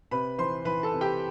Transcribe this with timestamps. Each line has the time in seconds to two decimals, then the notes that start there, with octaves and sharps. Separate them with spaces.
0.11 C3 B4 B5
0.38 E3 C5 C6
0.65 E3 B4 B5
0.83 A4 A5
0.92 C3
1.01 G4 G5